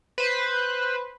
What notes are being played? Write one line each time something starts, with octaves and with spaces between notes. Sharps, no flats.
B4 C5